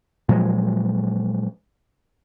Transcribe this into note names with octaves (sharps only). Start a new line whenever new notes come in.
A#2 F3 F#3 G#3